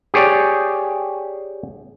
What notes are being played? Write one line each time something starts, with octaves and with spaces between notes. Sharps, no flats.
G4 G#4 C#5 D5